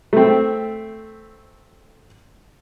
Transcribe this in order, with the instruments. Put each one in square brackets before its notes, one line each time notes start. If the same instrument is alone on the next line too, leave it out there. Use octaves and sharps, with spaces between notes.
[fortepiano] A3 C4